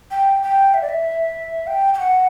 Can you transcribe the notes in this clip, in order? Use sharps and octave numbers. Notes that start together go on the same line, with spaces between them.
G5
G5
E5
D5
E5
G5
G5
F#5